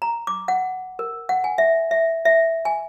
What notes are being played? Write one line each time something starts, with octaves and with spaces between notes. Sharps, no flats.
A#5
D6
F#5
A#4
F#5
G#5
E5
E5
E5
G#5